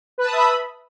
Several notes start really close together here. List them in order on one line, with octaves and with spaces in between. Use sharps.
B4 A5 D#6 E5 B5